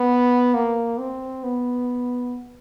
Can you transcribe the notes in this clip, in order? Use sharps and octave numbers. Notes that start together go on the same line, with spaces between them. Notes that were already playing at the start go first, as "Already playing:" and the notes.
Already playing: B3
A#3
C4
B3